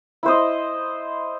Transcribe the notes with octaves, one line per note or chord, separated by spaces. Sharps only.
E4 C5 D#5